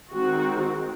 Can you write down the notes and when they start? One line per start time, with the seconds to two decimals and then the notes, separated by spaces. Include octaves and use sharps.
0.12 D#3 G#3 C4 F#4